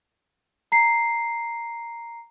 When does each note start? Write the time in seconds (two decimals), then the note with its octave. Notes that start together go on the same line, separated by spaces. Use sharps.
0.72 A#5 C7